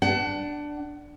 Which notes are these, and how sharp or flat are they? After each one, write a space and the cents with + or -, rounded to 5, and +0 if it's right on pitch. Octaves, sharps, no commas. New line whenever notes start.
D4 +0 F#5 +30